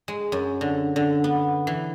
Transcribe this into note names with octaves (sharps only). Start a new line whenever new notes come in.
G#3
F#2
D3
D3
B3
E3